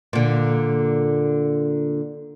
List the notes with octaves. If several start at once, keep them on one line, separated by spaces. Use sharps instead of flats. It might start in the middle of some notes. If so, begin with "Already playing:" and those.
A#2 D3